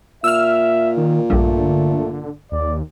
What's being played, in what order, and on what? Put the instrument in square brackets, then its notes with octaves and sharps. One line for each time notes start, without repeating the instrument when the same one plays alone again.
[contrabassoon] A#2 [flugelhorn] E5 [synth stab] E6 F6
[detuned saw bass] D#3
[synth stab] A#1 G2 [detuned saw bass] D3 [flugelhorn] A3
[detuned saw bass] D#2 [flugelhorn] D5